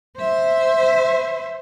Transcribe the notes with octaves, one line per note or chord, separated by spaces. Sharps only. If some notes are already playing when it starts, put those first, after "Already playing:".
C5 E5